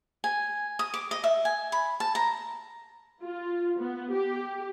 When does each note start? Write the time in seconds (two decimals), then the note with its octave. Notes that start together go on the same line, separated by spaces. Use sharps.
0.24 G#5
0.79 D#6
0.94 D6
1.11 D#5
1.24 E5
1.45 G#5
1.72 B5
2.00 A5
2.15 A#5
3.22 F4
3.79 B3
4.12 G4